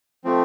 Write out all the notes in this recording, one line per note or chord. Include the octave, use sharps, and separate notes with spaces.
F3 A3 C4